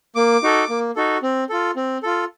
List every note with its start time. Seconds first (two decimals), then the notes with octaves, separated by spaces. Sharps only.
0.15 A#3 D6
0.43 D#4 F#4 A4
0.70 A#3
0.96 D#4 F#4 A4
1.23 C4
1.49 F4 A4
1.76 C4
2.03 F4 A4